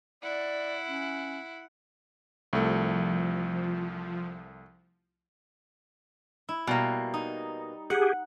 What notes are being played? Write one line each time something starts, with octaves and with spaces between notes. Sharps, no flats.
E4 D5 F#5
C#4
C2 F3 A3
E4
B2 G3 A#3
D#4
G4 G#4 F#5